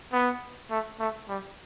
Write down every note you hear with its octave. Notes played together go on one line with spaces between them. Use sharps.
B3
A3
A3
G3